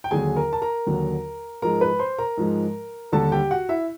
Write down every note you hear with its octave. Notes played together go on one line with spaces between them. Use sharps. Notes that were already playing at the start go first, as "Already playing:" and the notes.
G5
D#2 D3 F#3 G#4 G#5
A#4 A#5
A5
A#4 A#5
D#2 D3 F#3
G#2 F3 G#3 A#4 A#5
B4 B5
C5 C6
A#4 A#5
G#2 F3 G#3
D#2 D3 G3 A4 A5
G4 G5
F#4 F#5
E4 E5